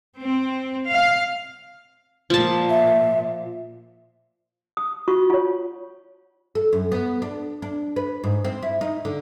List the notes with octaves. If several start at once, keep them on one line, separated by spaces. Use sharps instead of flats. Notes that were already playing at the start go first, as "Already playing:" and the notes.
C4
F5
A#2 F3 A5
E5
D#6
F4 F#4 C#6
F4 C#5
A4
F#2
B3
D4
D4
B4
G#2
C4
E4
D#4
D3